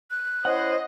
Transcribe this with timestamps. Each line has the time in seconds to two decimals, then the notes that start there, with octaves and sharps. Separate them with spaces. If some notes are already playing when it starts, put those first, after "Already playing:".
0.10 F#6
0.45 C#4 E4 C5 D#5 F#5